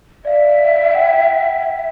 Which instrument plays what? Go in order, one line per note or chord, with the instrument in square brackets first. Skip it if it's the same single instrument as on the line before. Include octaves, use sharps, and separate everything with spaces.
[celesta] D5 F5 [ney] E5
[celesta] F#5 G5